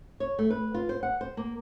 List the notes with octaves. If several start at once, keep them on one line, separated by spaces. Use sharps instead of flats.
C#5
A3
B4
F4
C5
F#5
C5
A#3